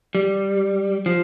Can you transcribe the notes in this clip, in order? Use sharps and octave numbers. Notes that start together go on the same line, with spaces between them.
G3
F3